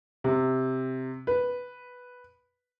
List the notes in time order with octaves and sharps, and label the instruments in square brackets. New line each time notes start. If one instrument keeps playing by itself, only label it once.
[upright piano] C3
B4